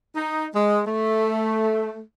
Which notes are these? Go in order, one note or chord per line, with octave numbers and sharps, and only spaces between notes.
D#4
G#3
A3